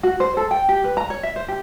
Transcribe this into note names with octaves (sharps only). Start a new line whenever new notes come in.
F#4
C5
A4
G5
G4
B4
A#5
C#5
E5
C5
G4